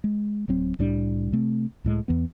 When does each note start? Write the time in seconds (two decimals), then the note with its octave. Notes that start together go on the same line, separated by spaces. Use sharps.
0.04 G#3
0.48 D1 F#3 C4
0.79 C2 A2 G3 D4
1.32 C3 A3 C4
1.84 C#2 A2 G#3
2.08 E2 E3 B3